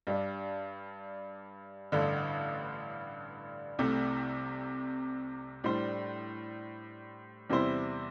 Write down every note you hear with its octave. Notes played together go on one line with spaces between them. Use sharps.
G2 G3 D4
A1 G2 D3
C2 C3 A3
A2 G3 D4 C5
E2 C3 G3 E4 C5